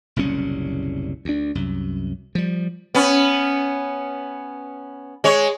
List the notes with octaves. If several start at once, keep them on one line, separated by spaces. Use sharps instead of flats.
F#1 C2 A#2 C#4
D2 D4
C2 F#2
F3 G3
B3 C#4
G#3 C#5